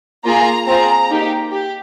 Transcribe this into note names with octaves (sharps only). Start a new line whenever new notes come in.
A#3 F4 G#4 A#5
C4 F4 G#4 A#5
A#3 D#4 G4
G4